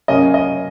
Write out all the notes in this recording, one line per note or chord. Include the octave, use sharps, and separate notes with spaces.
F#2 C#3 A#3 C#4 D#5
D#5